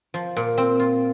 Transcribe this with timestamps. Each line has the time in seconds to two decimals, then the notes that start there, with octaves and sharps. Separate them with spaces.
0.14 F3
0.37 A#2
0.58 C4
0.80 F4